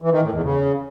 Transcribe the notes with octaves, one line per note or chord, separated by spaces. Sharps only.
E3
D#3
A2
E2
C#3